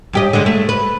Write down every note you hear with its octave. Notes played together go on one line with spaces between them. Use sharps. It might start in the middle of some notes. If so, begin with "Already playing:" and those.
G2 G4 D#5
D3 G#3
A3
B4